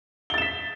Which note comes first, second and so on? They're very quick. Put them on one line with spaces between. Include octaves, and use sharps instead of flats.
G7 A6 E7 B6